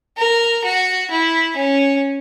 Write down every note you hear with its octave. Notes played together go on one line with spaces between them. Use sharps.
A#4
F#4
E4
C#4